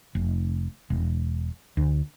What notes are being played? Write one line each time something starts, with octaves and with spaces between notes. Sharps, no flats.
F1
E1
D2